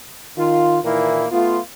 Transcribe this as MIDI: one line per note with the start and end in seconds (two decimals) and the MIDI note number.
0.38 0.78 51
0.38 0.78 65
0.83 1.25 46
0.83 1.25 51
0.83 1.25 52
0.83 1.25 58
0.83 1.25 64
1.31 1.59 57
1.31 1.59 59
1.31 1.59 65